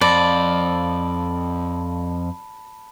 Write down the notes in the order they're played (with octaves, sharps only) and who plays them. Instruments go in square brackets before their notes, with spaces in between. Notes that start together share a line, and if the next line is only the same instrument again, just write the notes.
[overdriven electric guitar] F2 [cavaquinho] D5 [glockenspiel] A5 B5 F#7